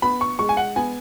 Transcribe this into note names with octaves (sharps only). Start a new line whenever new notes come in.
B3 B5
C#6
G#3 C#6
G#5
F#5
B3 G#5